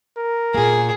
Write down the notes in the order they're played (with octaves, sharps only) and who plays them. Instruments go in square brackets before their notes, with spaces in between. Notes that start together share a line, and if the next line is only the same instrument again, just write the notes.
[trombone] A#4
[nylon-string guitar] A#2 A#3 [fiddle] G#4